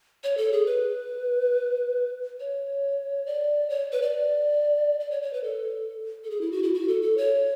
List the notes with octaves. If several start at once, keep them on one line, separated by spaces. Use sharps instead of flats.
C#5
A4
G#4
B4
C#5
D5
C#5
B4
D5
D5
C#5
C#5
B4
A4
A4
G#4
E4
F#4
E4
F#4
A4
A4
C#5